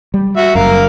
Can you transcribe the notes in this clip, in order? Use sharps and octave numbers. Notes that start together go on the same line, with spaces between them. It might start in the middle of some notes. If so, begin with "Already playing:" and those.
G3
F#4 E5
F#1 F#2 A#4 F5